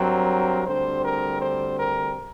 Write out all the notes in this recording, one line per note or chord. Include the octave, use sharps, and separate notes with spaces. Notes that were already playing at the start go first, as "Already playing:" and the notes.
Already playing: G2 F#3 C4 A#4
D2 D3 G3 C4 C5
A#4
C5
A#4